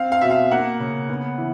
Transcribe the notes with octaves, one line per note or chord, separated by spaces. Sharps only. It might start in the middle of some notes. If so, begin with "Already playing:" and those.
Already playing: C4 F5
F5
B2 E5
F5
A#3 F#5
C#3
B3
E3